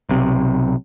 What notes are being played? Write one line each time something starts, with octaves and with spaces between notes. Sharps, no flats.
B1 C3